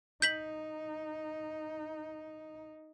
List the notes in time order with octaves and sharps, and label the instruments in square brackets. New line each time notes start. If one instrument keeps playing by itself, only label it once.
[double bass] D#4 [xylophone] G6 B6 F#7